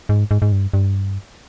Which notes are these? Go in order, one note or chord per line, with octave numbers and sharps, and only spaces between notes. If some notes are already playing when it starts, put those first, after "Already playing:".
G#2
G#2
G#2
G2
G2